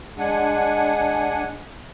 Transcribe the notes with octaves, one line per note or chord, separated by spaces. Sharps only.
G#3 D4 F#5 G#5